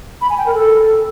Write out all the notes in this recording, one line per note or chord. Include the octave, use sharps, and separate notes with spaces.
B5
G#5
G5
A#4
A4